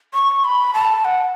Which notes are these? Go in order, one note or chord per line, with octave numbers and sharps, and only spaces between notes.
C#6
B5
A5
F#5